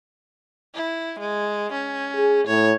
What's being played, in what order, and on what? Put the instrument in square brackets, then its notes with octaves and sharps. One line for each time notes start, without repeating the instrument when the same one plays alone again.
[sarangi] E4
G#3
C#4
[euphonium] G#4
[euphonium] A2 [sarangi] C#5